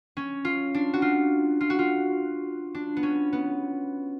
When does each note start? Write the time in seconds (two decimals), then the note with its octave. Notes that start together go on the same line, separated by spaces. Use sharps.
0.17 C#4
0.45 F4
0.74 D4
0.94 F#4
1.02 F4
1.61 F4
1.70 F#4
1.79 F4
2.75 D4
2.97 B3
3.03 C#4
3.33 B3